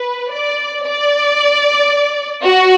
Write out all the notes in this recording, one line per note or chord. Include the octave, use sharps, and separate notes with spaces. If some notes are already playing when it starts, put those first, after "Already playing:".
Already playing: B4
D5
D5
F#4